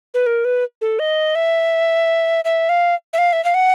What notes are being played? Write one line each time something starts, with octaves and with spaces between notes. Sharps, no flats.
B4
A#4
B4
A4
D#5
E5
E5
F5
E5
F5
E5
F5
F#5